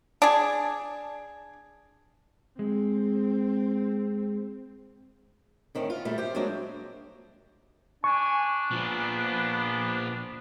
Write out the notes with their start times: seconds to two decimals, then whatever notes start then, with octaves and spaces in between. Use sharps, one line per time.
0.22 D4 G#4
2.59 G#3 C4
5.75 A2 D#3 C4 C#4
5.90 F4
6.05 A#2 G3 A3
6.18 G4 C5
6.35 F#3 G#3 A#3 C4 D4
8.04 D4 G#5 C#6
8.71 A#2 F3 B3